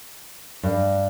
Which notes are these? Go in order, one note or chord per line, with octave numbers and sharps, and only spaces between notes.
G2